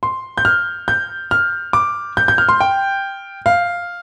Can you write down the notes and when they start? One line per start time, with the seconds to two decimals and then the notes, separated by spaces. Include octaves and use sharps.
0.03 C6
0.38 G6
0.45 F6
0.88 G6
1.31 F6
1.73 D6
2.17 G6
2.28 G6
2.38 F6
2.49 C6
2.60 G5
3.46 F5